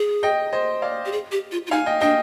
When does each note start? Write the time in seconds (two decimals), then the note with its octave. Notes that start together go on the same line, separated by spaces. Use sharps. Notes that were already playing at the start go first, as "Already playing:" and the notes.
Already playing: G#4
0.23 D#5 G5
0.53 C5 D#5
0.82 D5 F5
1.06 G4
1.12 G#4
1.32 G4
1.52 F4
1.67 F4
1.71 D#4 F5 G#5
1.86 D#5 G5
2.01 D4 D#5 G5